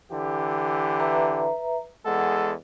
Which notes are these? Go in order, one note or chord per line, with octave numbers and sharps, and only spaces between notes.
D3 E3 G4
B4 E5 A#5
E2 G#3 A4 F#5